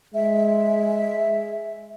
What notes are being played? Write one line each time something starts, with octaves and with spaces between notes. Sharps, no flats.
G#3 E5